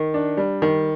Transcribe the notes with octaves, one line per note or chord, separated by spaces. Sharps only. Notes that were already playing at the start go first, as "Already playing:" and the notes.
Already playing: D#3
D4
G3
D#3